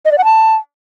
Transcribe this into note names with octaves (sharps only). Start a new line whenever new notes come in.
D#5
D5
F#5
A5